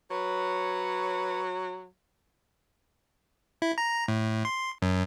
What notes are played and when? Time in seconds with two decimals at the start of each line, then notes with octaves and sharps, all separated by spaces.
0.11 F#3 B4 C#5
3.62 E4
3.78 A#5
4.08 A2
4.45 C6
4.82 F#2